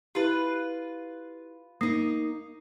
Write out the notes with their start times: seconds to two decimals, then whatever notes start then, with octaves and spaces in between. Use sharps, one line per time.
0.15 E4 F4 G4 B4
1.81 A#3 D#4 D#6 A#6 C7